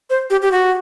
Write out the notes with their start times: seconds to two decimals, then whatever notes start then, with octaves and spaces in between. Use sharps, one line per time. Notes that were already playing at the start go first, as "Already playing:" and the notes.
0.10 C5
0.30 G4
0.42 G4
0.51 F#4